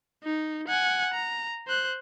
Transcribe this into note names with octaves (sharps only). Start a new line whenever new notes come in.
D#4
F#5 G#5
A#5
C5 F#6